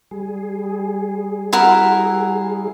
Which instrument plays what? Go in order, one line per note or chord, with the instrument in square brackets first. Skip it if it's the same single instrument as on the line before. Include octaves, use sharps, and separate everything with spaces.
[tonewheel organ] G3 G#4
[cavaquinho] E4 F#4 A#4